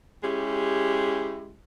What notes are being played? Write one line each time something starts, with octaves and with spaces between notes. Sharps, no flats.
G#3 C#4 E4 G4